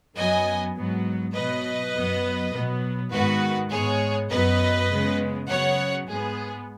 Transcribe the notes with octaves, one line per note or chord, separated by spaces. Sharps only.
F#2 F#3 B3 D#5 G#5
G#2 F#3 B3
B2 F#3 B3 B4 D#5
F#2 F#3 B3
B2 F#3 B3
G#2 D#3 G#3 B3 F#4 B4
G#2 G#3 B3 G#4 C#5
F#2 F#3 B3 B4 D#5
C#3 G#3 B3
C#3 F#3 B3 C#5 F#5
G#2 G#3 B3 G#4